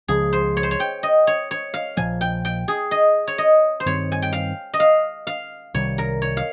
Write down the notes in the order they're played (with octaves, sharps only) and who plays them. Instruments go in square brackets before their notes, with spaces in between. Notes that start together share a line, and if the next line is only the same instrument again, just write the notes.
[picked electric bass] C#2 C#3 F3 G#3 [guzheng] G#4
[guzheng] C5
C#5
C5
C#5
G5
D#5
C#5
C#5
F5
[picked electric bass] A#1 A#2 F3 [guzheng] G#5
[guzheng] G5
G5
G#4
D#5
C#5
D#5
C5
[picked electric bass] G2 D#3 G3 C4 [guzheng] C#5
[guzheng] G#5
G5
F5
D#5
F5
F5
[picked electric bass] C2 C3 D#3 G3 [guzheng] C#5
[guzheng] A#4
C#5
F5